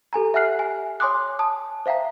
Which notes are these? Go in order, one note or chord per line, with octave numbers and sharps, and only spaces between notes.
G4 A4 G#5 A#5
E5 F#5 G#5 F6 F#6 C7
G#5
C#5 G#5 C6 D6 D#6 F#6
A5 D#6
C5 E5 F5 G5 A#5